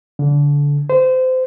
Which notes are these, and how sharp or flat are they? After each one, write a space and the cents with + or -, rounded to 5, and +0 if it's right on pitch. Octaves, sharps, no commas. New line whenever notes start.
D3 -25
C5 -25